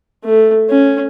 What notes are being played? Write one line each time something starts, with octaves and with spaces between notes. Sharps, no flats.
A3
C#4